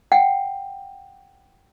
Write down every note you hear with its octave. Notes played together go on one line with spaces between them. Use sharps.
F#5 G5